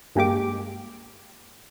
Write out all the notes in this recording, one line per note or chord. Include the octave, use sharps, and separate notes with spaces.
G2 G#3 A#3 G4 D6